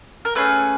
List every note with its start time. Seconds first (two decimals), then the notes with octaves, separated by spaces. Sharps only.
0.25 A#4
0.35 A3 C#4 G#4 B4